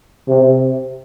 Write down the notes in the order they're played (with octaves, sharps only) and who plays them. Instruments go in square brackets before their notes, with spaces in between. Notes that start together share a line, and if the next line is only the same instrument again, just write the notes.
[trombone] C3